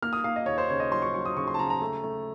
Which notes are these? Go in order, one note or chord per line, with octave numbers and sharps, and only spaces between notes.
A#3 F6
D#6
A#3 F5
D#5
D#2 C#5
C5
C#3 C#5
D#5
F#3 C6
C#6
F#3 C#6
D#6
C#3 C#6
C6
A5
C#3 A#5
A#5
A3
A3